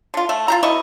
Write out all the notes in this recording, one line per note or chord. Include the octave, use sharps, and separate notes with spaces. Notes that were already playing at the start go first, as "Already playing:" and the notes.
D3 F4
A3 E5
F4 G4 A#5
B2 E4 D#5 C#6